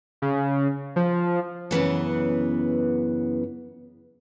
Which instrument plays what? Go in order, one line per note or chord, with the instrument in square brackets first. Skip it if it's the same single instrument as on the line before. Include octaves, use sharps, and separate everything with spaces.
[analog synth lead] C#3
F3
[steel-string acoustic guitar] F#2 C#3 E3 B3